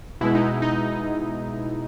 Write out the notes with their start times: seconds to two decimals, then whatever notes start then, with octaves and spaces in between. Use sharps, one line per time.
0.21 B2 G#3 B3 E4
0.35 D#4
0.62 D#4